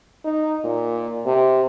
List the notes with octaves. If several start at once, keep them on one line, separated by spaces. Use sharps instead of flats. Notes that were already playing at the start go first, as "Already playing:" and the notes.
D#4
A#2
C3